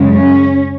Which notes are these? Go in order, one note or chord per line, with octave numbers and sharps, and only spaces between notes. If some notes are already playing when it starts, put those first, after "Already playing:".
Already playing: F#2 C#3 G#3
C#4